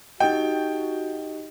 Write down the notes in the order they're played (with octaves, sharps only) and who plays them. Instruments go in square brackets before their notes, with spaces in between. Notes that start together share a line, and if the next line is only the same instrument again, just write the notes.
[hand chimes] D#4 G4 D#5 [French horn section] F#4 [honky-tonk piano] G5